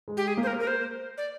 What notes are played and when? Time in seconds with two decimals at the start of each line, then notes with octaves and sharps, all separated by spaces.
0.08 G#3
0.17 G4
0.27 G#4
0.37 A#3
0.43 C5
0.47 A#4
0.60 A#4
0.67 C5
1.18 D5